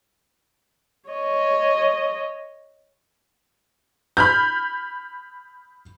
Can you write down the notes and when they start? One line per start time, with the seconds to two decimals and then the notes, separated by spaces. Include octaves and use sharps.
1.10 C#5 D#5
4.17 B5 F6 G6